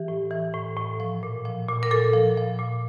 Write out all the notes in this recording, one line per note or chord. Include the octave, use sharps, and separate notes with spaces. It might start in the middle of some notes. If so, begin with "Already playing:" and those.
Already playing: E3 G4
A2
E3
A2
A2
F3
A#2
F3
A#2
A#4
A#2 A4
F3
F3
A#2